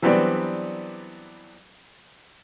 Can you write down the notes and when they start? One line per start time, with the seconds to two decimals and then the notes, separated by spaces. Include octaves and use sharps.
0.02 E3 F#3 G3 B3 C4 D4